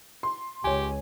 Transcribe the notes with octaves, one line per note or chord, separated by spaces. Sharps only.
C6
C#2 G4 C#5 G#5